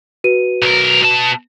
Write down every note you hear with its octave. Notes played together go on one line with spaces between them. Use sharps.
F#4 B4 D#7
B1 A#4
B2 A5